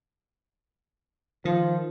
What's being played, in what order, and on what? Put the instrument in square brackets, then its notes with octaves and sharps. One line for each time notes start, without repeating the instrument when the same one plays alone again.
[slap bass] D#3 [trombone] F3